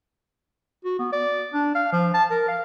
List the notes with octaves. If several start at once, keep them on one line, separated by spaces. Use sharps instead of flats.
F#4
B3
D5
D4
F5
F3
A5
A#4
F5